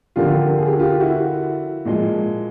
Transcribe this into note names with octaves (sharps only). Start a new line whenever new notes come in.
D3 F3 A#3 F4 G4
G#4
G4
F#4
F4 G4
E4 F#4
A#2 F3 G#3